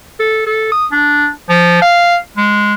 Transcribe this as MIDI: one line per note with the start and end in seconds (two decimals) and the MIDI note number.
0.20 0.45 69
0.47 0.69 69
0.72 0.87 87
0.92 1.28 62
1.49 1.80 53
1.82 2.16 77
2.37 2.74 56